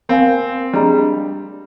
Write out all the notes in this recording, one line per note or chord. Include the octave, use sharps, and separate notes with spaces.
C4 A#4 F5 G#5
G3 D4 G#4 D#5 A#5